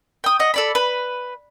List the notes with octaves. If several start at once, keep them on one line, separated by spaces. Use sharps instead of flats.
G5 D#6
D#5 F#5
A4 D5 B5
B4